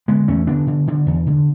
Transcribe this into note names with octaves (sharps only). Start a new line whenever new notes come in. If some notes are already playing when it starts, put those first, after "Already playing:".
D3 G#3 B3
E2 A3 C#4
D3 B3 D4
D3
D3
E2
D3